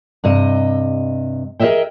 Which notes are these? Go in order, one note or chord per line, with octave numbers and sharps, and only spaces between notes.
G2 C3 D#5
G#4 A#4 C#5 D#5 E5 G5